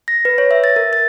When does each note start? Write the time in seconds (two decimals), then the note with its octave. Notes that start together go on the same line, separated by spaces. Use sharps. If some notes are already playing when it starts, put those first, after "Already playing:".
0.08 A#6
0.25 B4
0.38 C#5
0.51 E5
0.64 A6
0.76 A#4
0.93 A6